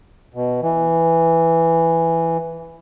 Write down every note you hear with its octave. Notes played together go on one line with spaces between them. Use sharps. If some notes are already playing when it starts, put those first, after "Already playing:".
B2
E3